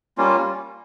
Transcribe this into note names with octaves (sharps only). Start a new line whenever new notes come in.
G3 A#3 C#4 F4